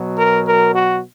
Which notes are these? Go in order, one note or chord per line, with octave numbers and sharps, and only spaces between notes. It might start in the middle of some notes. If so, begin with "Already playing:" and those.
Already playing: B2 F#3
A#4
A#4
F#4